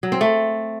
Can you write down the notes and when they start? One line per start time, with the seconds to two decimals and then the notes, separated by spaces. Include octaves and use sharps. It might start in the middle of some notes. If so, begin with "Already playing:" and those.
0.03 F#3
0.12 C4
0.21 A3